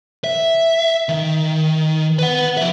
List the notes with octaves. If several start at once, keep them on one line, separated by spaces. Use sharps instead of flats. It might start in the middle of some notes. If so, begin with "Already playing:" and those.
E5
D#3
B4 F#5
F3 E5